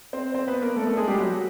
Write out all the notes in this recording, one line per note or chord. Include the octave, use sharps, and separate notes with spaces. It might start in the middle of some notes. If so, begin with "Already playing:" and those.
C4 C5
C4 C5
B3 B4
A#3 A#4
A3 A4
A3 A4
G#3 G#4
G3 G4
F#3 F#4